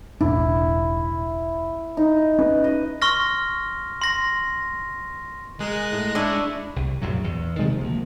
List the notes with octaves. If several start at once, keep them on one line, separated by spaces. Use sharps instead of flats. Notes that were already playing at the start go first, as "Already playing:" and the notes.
E1 A1 D4 E4
D#4
C#4 B4
D#5
C6 C#6 F6 A#6
C6 A#6
G#3 G#4 A#4 D#5 F#6
A2
D4 E4 C#6
C2
A#1 F#2 A2 F#3
E2
C3 D#3 F3 G#3
D2 F3 G#3 A#3